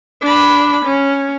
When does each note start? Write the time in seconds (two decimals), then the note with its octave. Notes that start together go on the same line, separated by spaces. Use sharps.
0.22 D4 B5
0.86 C#4